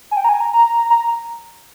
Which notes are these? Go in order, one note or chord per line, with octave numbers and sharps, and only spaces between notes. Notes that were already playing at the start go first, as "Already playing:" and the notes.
G#5
G5
A#5
G#5
A#5
A#5
A#5